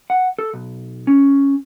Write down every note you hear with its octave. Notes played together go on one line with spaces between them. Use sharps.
F#5
A4
B1
C#4